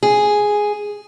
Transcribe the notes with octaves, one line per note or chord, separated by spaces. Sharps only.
G#4